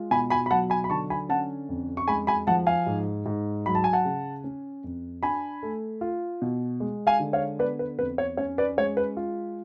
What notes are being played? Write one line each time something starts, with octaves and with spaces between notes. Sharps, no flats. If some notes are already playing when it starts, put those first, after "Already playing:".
Already playing: G#3 F4
B2 G#5 B5
G#5 B5
B5
F#3 F#5 A5
G#5 B5
B5
D3 A5 C#6
G#5 B5
C#4 F#5 A5
F2
C#6
G#3 G#5 B5
G#5 B5
F3 F#5 A5
F5 G#5
G#2
G#2
F#3 B5
A5
G#5
F#5 A5
C#3
C#4
F2
D4 G#5 B5
A3
F4
B2
G#3
F5 G#5
D3
C#5 F5
B3 B4 D5
B4
F2 B4
C#5
C#4 C#5
B4 D5
G#3 C#5
B4
F4